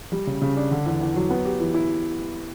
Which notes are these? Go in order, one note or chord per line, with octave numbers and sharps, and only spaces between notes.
G3
C#3
C#3
D4
D3
E2
E2
F#3
B3
G4
E3
E4